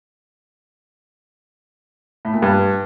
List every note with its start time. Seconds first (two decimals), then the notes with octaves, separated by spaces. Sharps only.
2.25 A2
2.34 A#2
2.42 G2